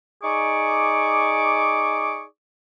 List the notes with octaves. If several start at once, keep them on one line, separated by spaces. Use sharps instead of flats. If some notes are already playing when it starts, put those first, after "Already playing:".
D#4 G#4 D5 C#6 D6